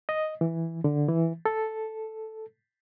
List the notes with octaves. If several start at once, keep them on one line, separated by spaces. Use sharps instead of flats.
D#5
E3
D3
E3
A4